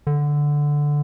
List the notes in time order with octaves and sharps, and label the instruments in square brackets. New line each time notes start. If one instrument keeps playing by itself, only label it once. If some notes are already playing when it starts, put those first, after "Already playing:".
[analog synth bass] D3